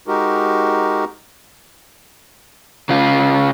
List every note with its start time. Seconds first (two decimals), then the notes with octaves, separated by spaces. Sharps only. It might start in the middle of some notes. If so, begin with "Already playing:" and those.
0.08 G#3 D#4 F#4 G4 A#4
2.89 C#3 F4